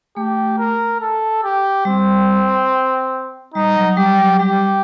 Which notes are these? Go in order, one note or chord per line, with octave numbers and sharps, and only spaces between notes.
A3 G4
A#4
A4
G4
G3 C4
G3 D#4
F#3
G3 G4
F#3
G3 G4